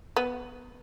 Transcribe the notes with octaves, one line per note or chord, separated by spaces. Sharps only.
B3